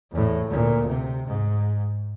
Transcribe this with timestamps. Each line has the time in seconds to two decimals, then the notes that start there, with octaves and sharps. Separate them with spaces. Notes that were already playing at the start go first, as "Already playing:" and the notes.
0.12 E2 A2
0.47 D2 A#2
0.87 C3
1.27 G#2